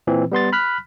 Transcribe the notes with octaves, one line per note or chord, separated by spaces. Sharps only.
A#2 E3 C4
G3 B3 C6 A6
B5 F6 F#6 B6